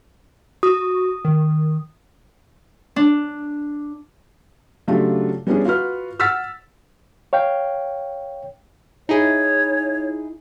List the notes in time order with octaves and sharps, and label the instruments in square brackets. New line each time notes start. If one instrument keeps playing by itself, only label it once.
[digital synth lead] F#4 [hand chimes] D#6
[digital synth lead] D#3
[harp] D4
[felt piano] C#3 F#3 A3 D4 F4 G4
G3 B3 C#4 D4 E4 G#4
F4 F#4 B4 F6
F#5 E6 F6 A6 B6
[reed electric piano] C#5 F5 G5
[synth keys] D#4 E4 G#4 [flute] C#5